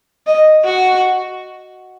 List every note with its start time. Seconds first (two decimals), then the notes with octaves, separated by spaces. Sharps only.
0.27 D#5
0.65 F#4